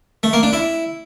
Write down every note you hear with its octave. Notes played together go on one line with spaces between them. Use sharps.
A3
A#3
D4
E4